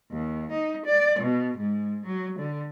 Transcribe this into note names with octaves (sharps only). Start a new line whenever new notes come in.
D#2
D#4
D5
B2
G#2
F#3
D3